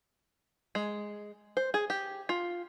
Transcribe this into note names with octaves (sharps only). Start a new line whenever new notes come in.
G#3
C5
G#4
G4
F4